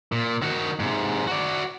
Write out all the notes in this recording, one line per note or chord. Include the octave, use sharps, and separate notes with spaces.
A#2
D#3 F#4
G#2 C3
F#4 D5